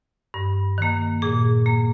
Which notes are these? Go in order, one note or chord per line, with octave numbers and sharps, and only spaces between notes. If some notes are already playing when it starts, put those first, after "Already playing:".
G2
D#3 A#3
A#2 G#4
A#3